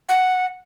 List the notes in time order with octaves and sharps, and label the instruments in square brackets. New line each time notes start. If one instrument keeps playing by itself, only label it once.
[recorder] F#5